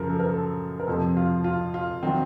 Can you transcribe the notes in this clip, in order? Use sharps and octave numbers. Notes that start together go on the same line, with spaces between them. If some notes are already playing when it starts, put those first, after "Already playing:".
Already playing: F#2 C#3 F3 A#4
A4
A#4
A4
A#4
F2 C3 F3 A4
F4
F4
F4
D#3 F#3 C4